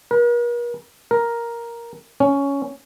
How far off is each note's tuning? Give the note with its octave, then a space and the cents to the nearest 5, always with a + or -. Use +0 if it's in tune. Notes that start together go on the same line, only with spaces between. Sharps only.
A#4 +45
A#4 +5
C#4 +10